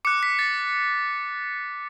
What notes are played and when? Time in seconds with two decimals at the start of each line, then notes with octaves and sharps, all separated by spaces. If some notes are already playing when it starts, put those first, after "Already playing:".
0.05 D6 F#6 C#7
0.23 B6
0.39 A6